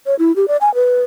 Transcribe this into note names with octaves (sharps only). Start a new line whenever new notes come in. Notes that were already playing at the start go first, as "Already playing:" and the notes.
C#5
E4
G4
D5
G#5
B4